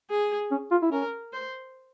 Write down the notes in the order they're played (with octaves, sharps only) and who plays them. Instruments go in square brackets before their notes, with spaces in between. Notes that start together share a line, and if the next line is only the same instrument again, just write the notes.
[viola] G#4
[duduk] C#4
F4
E4
[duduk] C#4 [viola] A#4
[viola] C5